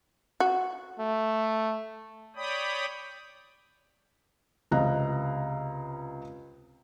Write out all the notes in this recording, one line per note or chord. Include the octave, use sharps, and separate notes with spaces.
F#4
A3
C#5 D5 G5 B5 D#6
C#2 C3 D#5 A#5 F#6